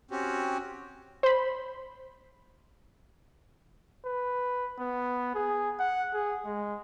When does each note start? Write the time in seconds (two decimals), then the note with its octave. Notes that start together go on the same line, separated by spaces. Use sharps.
0.11 C4 C#4 F#4 G4
1.23 C5 B5
4.06 B4
4.79 B3
5.35 G#4
5.80 F#5
6.14 G#4
6.46 G#3